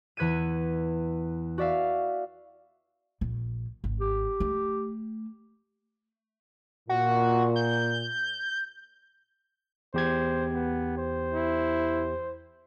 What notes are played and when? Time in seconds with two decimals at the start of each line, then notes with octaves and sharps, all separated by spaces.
0.17 E2 E3 B4 G#6 C#7 D#7
1.58 F#4 D5 E5 F5
3.21 A#1
3.84 G#1
4.00 G4
4.40 A3
6.89 A#2 F#4
7.56 G6
9.94 E2 G4 C5 G#6
10.54 B3
10.98 C5
11.34 E4